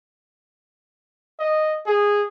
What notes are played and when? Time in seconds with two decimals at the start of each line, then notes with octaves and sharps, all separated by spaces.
1.40 D#5
1.87 G#4